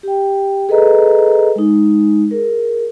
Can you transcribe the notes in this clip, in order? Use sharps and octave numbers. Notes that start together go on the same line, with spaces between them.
G4 G5
G#4 A4 B4 D#5 A#5
G#3 D#4
G#4 A#4